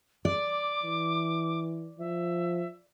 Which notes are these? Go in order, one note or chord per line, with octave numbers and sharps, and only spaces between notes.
D5 D6
E3
F3 E5